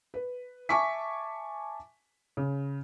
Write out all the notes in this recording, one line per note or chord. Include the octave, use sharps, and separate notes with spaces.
B4
E5 G#5 A5 C#6 D6 B6
C#3